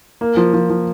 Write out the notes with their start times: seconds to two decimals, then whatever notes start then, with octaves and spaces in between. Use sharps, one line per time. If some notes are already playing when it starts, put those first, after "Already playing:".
0.21 A#3
0.37 F3
0.53 F3
0.70 F3